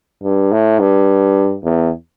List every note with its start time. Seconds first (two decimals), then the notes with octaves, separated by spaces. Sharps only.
0.23 G2
0.52 A2
0.80 G2
1.64 E2